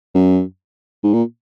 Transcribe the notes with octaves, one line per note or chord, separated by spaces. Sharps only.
F#2
G#2
A#2